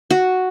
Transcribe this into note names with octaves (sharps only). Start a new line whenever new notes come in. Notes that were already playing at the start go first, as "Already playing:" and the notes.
F#4